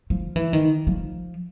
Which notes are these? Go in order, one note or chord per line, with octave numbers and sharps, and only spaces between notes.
F3
E3
D#3
F3